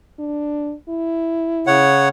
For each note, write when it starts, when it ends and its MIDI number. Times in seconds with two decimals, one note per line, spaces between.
0.19 0.74 62
0.89 1.88 64
1.67 2.09 49
1.67 2.09 73
1.67 2.09 78